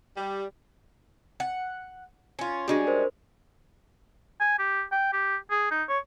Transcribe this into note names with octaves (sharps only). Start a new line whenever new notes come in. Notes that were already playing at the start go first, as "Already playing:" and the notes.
G3
F#5
C#4 F4
G3 G#3 C#4 D4 F#4
A#4 C5
G#5
G4
G5
G4
G#4
D#4
C#5